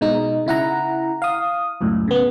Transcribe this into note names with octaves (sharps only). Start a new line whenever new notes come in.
B2 G#3 D#4
C#3 E4 F#5 A#5
F5 D#6
C#2 F#2 A2
C#3 B3